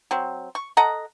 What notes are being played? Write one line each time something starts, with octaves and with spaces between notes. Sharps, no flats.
F#3 C4
C#6
A4 D#5 F#5 A#5